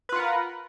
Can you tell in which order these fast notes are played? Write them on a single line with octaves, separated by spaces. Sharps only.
B4 F4 F#5 A#4